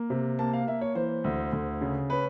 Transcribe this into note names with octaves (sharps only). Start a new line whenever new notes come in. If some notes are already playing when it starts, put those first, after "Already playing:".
Already playing: A#3
C3
A#3 A5
F5
A#3 E5
C#5
E3 C5
D2
D2
C#3
C#4 B4